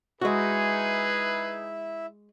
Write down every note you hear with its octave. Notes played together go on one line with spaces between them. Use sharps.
G#3 D#4 E4 F#4 G#4 B4 E5